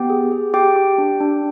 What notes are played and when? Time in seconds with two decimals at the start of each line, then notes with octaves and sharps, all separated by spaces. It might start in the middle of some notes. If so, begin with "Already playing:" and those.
Already playing: B3 G4 G5
0.10 G#4
0.32 G#4
0.54 G4 G5
0.76 G4
0.98 D4
1.20 D4